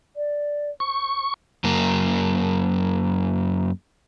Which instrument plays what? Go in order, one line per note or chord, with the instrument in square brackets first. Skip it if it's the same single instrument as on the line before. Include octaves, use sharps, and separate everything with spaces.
[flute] D5
[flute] C5 [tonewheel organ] C#6
[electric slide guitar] F#2 A#3